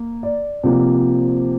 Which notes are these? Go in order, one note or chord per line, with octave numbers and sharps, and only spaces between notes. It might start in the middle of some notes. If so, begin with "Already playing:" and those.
Already playing: A#3
D5
C3 F3 A#3